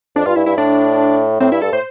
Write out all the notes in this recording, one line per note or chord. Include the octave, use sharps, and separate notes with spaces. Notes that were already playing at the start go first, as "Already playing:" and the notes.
F2 D4
G2 F4
G2 E4
G2 E4
A2 D4
A2 C4
G2 E4
G2 A4
A2 C5